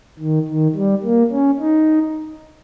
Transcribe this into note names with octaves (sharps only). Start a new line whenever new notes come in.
D#3
D#3
G3
A#3
C#4
D#4